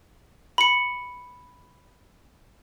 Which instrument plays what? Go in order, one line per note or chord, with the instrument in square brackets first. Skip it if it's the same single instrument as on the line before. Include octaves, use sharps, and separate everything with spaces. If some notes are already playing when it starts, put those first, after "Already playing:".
[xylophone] B5 C#7